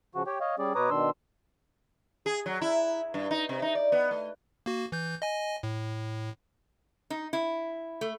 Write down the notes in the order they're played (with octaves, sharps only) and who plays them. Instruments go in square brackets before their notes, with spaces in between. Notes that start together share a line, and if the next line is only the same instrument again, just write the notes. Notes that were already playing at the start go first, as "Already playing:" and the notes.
[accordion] C#3 F3 F#4
G4 C#5 G5
C#5 D#5 F5
G3 C#4 G#4 D5
B2 B4 C#5 A#5 D6 D#6
B2 D#3 D4 C6 E6
[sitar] G#4
F#3
E4
G2
D#4
C3
D#4
D5
B3
A3
[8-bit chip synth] A#3 F#4
E3 G6
D#5 G#5
A2
[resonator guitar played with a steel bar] D#4
E4
A3